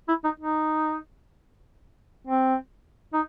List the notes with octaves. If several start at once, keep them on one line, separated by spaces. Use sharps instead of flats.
E4
D#4
D#4
C4
D#4